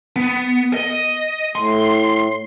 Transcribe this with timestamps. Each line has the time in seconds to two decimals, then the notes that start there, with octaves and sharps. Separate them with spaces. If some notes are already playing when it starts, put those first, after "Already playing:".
0.16 B3
0.74 D#5
1.55 A2 C6